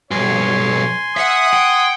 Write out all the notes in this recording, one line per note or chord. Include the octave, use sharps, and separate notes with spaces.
B1 G2 C#5 G#5 C6
E5 F#5 D#6
G5